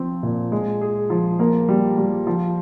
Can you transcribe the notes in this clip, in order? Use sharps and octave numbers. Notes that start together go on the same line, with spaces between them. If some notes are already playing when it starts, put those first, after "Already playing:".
Already playing: F3 C4
A#2
G#3
G#4
F3
A#3
G3
G3
F3